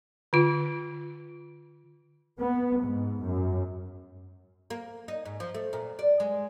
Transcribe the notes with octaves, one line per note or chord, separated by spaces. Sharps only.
D3 F4
B3
G#2
F#2
A#3
D#4
G#2
F3
A3
A#2
D5
G#3